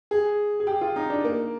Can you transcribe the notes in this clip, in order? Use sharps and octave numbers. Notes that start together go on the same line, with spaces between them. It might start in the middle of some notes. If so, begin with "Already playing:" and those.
G#4
G#4
G4
F4
D#4
D4
A#3